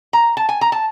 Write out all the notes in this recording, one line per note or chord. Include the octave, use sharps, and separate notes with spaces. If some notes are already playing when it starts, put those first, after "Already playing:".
A#5
A5
G#5
A#5
A5